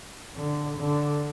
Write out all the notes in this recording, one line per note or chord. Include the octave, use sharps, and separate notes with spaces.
D3
D3